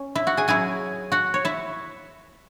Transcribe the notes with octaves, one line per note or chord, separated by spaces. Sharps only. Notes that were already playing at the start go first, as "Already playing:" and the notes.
Already playing: C#4
E4 E5
F#4 F#5
G#4 G#5
F#3 C#4 E4 G#4 G#5
F#4 F#5
C#5
E4 E5